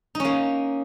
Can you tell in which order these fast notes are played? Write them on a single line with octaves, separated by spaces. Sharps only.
D#4 C#4 A#3